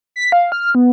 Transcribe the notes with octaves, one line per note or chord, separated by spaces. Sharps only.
B6
F5
F6
B3